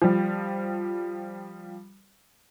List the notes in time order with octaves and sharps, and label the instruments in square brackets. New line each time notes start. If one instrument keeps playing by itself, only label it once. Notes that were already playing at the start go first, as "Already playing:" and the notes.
[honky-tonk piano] F3 G3